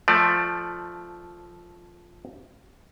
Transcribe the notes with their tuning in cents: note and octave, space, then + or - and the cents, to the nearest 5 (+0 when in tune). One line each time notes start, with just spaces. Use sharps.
F3 +0 A3 +0 D5 +25